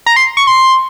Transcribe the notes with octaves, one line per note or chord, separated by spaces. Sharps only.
A#5
C6
C#6
C6